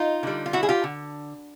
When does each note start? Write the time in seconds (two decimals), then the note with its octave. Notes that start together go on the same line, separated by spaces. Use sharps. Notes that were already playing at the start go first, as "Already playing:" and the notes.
Already playing: D#4 F4
0.23 D3 G3
0.46 F4
0.53 E4 F#4
0.63 G#4
0.69 F4 G4
0.84 D3